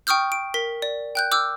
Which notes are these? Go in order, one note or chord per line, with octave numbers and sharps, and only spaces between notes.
G5 C#6 D#6 F6 G6
D7
A#4 B6
D5
G5 F#6 G6
D6 E6 F6 G6